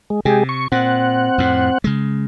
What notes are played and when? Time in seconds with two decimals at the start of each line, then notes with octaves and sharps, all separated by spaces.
0.10 G#3
0.25 C3 G#3 G4 G#4
0.49 C#6
0.72 A#2 C4 F#5
1.38 F2 A2
1.84 C#3 G#3